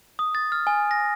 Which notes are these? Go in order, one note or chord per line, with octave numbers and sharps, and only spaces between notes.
D#6
A6
F6
G#5
A#6